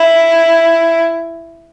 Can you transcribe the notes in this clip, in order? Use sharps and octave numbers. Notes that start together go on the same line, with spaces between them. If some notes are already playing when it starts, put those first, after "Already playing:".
Already playing: E4